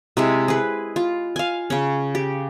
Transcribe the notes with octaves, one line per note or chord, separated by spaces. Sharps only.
C3 G#3 E4
G#4 B4
F4
F5 G#5
C#3 C#4
G4